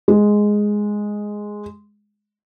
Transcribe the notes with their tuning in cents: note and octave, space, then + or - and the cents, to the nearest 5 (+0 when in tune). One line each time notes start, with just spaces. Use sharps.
G#3 +0